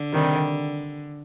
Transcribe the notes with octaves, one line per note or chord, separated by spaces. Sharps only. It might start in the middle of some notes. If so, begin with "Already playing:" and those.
Already playing: D3
C3 D#3 G3